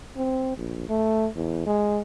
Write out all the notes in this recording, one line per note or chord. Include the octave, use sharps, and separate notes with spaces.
C4
A#1
A3
E2
G#3